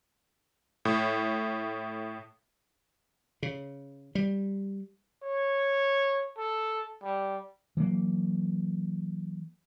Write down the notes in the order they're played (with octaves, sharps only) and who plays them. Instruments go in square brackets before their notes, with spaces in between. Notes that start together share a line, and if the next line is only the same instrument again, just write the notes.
[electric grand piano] A2
[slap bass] C#3
G3
[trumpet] C#5
A4
G3
[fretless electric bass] E3 F#3 A#3